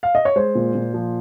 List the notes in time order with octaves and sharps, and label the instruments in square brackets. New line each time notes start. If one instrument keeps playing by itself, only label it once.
[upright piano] F5
D#5
C#5
G#3 C5
A#2
A#2
F3